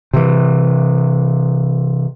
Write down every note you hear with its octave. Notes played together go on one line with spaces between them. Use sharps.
C3 E3